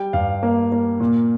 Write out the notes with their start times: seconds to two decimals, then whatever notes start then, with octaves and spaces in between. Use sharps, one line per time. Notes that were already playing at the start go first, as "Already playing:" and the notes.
Already playing: G3 G5
0.13 G2 F5
0.43 A#3
0.72 A#3
1.00 A#2